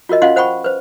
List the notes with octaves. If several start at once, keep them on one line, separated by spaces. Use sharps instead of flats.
F4 F#4 A#4 D#5
C#4 F4 D#5 F5 F#5 C6
C5 F#5 G5 B5 C#6
B4 C5